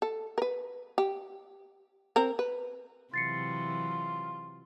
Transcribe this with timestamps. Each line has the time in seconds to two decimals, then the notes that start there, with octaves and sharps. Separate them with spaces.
0.02 A4
0.38 A#4 B4
0.98 G4
2.16 C4 A#4
2.39 B4
3.14 C3 E3 F#3 F4 A6 C7 C#7